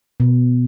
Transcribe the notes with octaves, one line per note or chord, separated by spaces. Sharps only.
B2